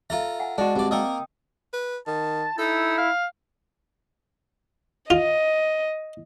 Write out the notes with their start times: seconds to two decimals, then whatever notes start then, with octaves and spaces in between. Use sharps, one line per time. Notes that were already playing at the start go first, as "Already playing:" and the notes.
0.10 F4 A4 E5 A#5
0.40 F#5 G#5
0.58 G#3 D4 F#4 D5 A5
0.76 G2 C4 D5
0.91 A#3 A#4 D#5 G5 D#6 E6
1.73 B4
2.07 D#3 A5
2.58 D#4 E4 A4
2.98 F5
5.10 F4 D#5